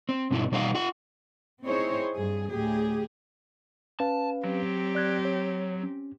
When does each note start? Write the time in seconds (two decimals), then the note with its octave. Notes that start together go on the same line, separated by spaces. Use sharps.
0.09 C4
0.31 G2 B2 C4 D#4 E4
0.52 B2 G3 D#4 B4 F5 F#5
0.75 F4 F#5
1.65 C4 D#4 E4 G#4 C5 C#5
2.16 G2 G#4
2.49 D2 A2 G4 G#4
4.00 C#4 B4 F5 A5
4.44 F#3 C4 G4
4.95 D5 F#6 G#6
5.25 C#5
5.83 C#4